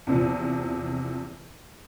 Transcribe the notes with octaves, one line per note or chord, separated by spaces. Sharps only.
E2 C3 F3